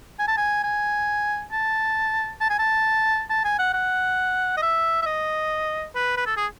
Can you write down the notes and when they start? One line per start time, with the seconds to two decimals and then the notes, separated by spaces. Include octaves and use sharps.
0.19 G#5
0.28 A5
0.38 G#5
0.64 G#5
1.52 A5
2.41 A5
2.50 G#5
2.59 A5
3.30 A5
3.45 G#5
3.59 F#5
3.74 F#5
4.57 D#5
4.62 E5
5.02 E5
5.06 D#5
5.95 B4
6.17 B4
6.27 A4
6.37 G#4